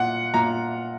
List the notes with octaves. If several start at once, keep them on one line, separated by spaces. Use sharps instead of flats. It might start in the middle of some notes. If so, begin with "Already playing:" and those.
Already playing: A#2 F#5
A#2 A#5